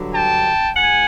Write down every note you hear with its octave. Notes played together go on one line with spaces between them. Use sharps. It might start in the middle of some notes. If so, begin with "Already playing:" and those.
Already playing: G2 D3 F#3
G5 A5
G#2 F#5 G#5